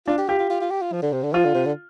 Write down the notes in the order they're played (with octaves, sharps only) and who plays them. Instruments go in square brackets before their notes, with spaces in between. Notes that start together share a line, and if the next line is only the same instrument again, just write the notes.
[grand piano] D4 [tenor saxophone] F4
[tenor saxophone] G4
[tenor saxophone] F4 [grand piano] G4
[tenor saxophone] F4
F4
F4
G4
F4
F3
D3
C3
D3
[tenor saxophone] F3 [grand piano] F4
[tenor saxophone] D3
C3
D3